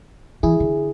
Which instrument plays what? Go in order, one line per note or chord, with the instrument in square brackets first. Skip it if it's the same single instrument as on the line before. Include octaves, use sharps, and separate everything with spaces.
[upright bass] E3 [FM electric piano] E4 G#4
[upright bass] D3